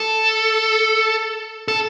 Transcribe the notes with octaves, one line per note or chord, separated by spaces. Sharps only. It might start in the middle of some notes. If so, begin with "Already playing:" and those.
Already playing: A4
A4